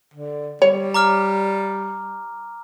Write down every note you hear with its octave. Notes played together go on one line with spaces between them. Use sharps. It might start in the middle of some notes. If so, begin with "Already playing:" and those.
D3
G3 C#5
A#5 D6 F6